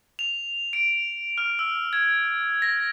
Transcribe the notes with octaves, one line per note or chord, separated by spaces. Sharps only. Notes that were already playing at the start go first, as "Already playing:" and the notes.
F7
D7
F6
E6
G#6
A#6